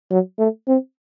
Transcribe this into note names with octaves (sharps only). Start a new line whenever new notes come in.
F#3
A3
C4